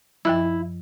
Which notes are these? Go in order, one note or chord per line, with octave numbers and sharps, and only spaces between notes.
F#2 F3 E4 E6